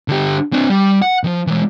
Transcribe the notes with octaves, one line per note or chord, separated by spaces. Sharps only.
D3 G4
C4 D4
G3
F#5
D#3 F3
E3 G#3